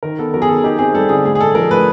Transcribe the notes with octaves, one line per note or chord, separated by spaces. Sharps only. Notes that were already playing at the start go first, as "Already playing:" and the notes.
D#3 A#4
B3 A4
F#3 A#4
G#4
D#3 A4
D#4 G4
C4 G#4
G3 A4
D3 G#4
A2 G#4
G#4
G#3 A4
F3 A#4
A2 B4